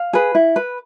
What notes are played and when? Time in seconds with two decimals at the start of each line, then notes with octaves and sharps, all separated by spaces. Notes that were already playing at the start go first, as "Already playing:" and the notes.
Already playing: F5
0.13 G#4 B4
0.35 E4
0.56 B4